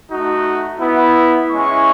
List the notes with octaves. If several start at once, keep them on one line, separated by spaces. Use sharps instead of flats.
A3 D#4 F#4
B3 E4
G#3 C#4 E4 C#6